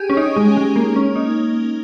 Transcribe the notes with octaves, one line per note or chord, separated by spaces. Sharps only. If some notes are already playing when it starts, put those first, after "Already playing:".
Already playing: G4 G#4
C#4
D#4
G#3
G#3
A#3
C#4
D#4